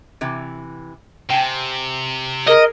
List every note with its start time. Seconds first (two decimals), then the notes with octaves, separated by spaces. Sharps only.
0.21 C3 E3
1.30 C3 G5 G#5
2.48 G#4 A#4 D#5